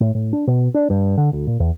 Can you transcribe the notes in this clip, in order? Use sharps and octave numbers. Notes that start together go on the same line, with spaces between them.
A2
A2
D4
B2
D4
G2
D3
D2
A#2
E2